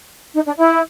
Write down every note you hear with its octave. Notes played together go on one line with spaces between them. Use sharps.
D#4
D4
E4